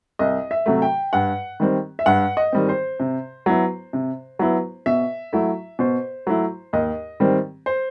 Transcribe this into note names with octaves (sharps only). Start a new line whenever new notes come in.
C2 D#5
E5
C3 F#3 A3
G5
G2 F#5
D#3 G3 C4
E5
G2 F#5
D#5
D#3 G3 C4
C5
C3
F#3 B3 E4
C3
F#3 B3 E4
B2 E5
F#3 A3 E4
B2 C5
F#3 A3 E4
D#2 D#5
D#3 G3 C4
C5